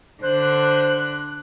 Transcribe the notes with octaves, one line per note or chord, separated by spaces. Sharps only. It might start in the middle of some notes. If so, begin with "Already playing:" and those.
D3 D4 C5 F#6